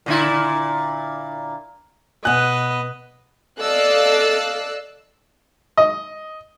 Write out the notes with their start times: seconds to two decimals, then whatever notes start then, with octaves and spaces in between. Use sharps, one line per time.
0.06 A#2 D3 E4
2.25 B2 B3 B4 D#5 G#5 F#6
3.58 A4 D5 D#5 F5 E6 F#6
5.77 D#5